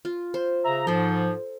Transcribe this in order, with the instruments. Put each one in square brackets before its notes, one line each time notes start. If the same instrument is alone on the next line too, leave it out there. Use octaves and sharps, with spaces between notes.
[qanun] F4
C5
[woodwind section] C#3 E5 A#5
[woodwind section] G#2 F3 [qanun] A4 C5